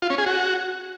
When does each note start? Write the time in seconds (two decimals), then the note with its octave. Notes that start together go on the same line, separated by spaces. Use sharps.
0.02 F4
0.10 C#4
0.18 G#4
0.26 F#4